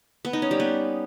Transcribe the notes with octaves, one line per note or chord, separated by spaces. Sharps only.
B3
D#4
C#4
G3
B3